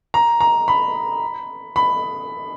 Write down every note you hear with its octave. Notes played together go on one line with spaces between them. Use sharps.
A#5
A#5
B5
B5